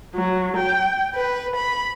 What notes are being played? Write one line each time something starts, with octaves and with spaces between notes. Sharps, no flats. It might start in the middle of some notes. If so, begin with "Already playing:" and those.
F#3
G5
B4
B5